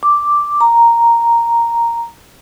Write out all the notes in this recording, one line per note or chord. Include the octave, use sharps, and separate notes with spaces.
D6
A#5